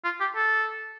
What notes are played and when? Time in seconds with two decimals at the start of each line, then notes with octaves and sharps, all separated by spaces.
0.04 F4
0.20 G4
0.36 A4